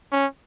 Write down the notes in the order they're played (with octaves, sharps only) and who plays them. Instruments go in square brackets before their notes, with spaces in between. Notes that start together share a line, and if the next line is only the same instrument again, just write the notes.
[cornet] C#4